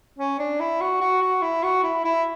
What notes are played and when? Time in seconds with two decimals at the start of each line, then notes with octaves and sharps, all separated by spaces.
0.19 C#4
0.39 D4
0.60 E4
0.81 F#4
1.01 F#4
1.21 F#4
1.42 E4
1.63 F#4
1.83 E4
2.05 E4